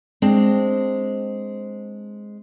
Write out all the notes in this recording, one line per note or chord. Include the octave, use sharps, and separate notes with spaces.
G#3 C4 D4